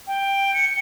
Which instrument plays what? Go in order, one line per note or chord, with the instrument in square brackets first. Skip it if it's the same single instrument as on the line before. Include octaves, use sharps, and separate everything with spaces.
[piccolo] G5
C#7